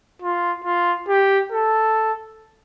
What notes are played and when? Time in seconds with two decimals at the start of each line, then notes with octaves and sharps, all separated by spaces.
0.22 F4
0.64 F4
1.09 G4
1.52 A4